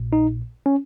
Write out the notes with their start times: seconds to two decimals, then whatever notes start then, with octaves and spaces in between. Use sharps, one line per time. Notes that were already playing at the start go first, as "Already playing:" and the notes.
Already playing: A#1 A#2
0.13 D#4
0.66 C#4